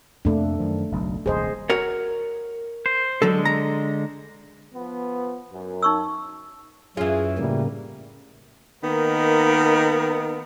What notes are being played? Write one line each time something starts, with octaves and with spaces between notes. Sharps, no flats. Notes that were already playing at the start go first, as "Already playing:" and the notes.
F2 C3 A3 A#3 D4
F#2 D#3 F3
F#1 B1 F#2
D#1 C2 G#4 C5 D#5
F#4 A#4 C#5
C5
D3 F#3 G#3 A4
A#5
F3 B3
F#2
D#4 C#6 E6
F#2 E3 C#4 F4 G#4
A2 C#3 G3 A#3
D#3 A#3 B3 D#4 A#4